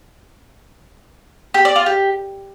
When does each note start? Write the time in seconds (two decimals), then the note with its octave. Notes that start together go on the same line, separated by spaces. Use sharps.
1.54 G4
1.65 D5
1.76 F4
1.86 G4